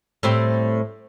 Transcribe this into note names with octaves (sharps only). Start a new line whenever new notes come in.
A2 G3 C4